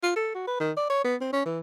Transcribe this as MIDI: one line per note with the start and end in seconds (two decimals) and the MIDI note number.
0.03 0.11 65
0.16 0.31 69
0.35 0.44 66
0.47 0.58 71
0.60 0.72 51
0.77 0.88 74
0.90 1.03 73
1.05 1.15 59
1.21 1.31 60
1.33 1.42 61
1.46 1.60 52